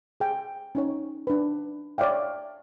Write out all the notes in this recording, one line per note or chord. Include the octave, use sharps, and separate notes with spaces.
G#4 G5
C#4 D#4 C#5
D4 B4
C#5 D5 E5 F5 G5